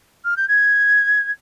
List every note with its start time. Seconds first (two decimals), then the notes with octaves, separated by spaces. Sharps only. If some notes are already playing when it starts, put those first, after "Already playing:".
0.24 F6
0.36 G6
0.48 G#6